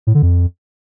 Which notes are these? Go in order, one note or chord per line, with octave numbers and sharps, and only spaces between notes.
A2
D3
F2